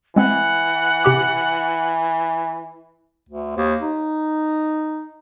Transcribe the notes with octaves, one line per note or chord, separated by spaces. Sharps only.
E3 G#3 C4 F#5
C3 G4 D6
D2
D#2
D#4